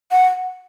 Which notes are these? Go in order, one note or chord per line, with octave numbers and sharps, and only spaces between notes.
F#5